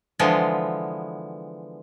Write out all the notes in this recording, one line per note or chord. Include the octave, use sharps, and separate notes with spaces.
D3 E3 F3 G#3 B3